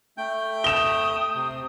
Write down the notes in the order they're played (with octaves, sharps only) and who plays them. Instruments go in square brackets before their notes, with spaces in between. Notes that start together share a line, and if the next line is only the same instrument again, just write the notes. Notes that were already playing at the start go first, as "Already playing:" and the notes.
[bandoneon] A3 G5 G6
[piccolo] D#6 [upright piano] E7 G7
[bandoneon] C3